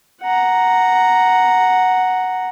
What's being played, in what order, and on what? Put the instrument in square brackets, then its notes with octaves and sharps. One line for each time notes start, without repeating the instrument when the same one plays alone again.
[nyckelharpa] F#5 A#5